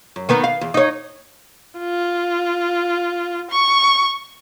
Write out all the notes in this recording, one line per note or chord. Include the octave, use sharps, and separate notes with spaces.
F#2
D#3 B3 B4
F5
E2
D#4 C#5
F4
C#6